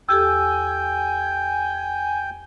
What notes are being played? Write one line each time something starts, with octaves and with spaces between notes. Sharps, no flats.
E2 G4 A4 G5 G#5 E6